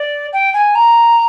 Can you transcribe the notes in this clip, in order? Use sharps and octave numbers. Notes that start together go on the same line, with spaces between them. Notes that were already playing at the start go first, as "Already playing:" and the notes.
Already playing: D5
G5
G#5
A#5